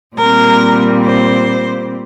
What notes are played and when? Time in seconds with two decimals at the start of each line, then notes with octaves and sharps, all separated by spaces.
0.16 A#2 G3 C4 A#4
1.04 C5